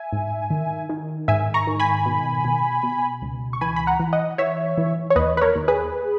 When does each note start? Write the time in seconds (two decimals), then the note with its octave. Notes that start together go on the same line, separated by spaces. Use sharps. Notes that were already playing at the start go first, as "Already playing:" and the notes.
Already playing: E5 G#5
0.12 G#2
0.50 D#3
0.89 D#3
1.28 G#2 E5 G#5
1.54 A#5 C#6
1.67 D#3
1.80 G#5 B5
2.06 B2
2.45 B2
2.83 B2
3.22 C#2
3.53 C#6
3.61 E3 G#5 B5
3.76 B5
3.87 F#5 A#5
4.00 E3
4.13 D#5 F#5
4.38 E3 C#5 E5
4.78 E3
5.10 C#5
5.16 D#2 B4 D#5
5.37 B4
5.41 A#4 C#5
5.55 D#2
5.68 G#4 B4